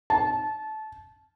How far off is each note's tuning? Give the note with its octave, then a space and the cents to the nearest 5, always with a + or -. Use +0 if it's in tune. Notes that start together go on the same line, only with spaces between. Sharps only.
A5 -20